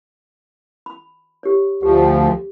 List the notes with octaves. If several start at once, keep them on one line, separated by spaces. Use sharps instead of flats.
B5
G4 C#5
D2 F3 G4